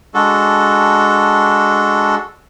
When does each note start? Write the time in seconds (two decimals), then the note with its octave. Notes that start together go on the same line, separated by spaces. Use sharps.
0.14 G#3 D4 F#4 A4